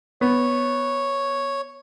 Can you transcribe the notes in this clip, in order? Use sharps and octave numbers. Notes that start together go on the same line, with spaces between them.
B3 C#5